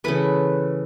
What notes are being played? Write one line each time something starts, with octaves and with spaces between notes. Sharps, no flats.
C#3 E3 A3 B4